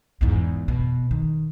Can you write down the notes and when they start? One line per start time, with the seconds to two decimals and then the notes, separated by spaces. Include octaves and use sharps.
0.21 E2 G#2
0.68 B2
1.11 D#3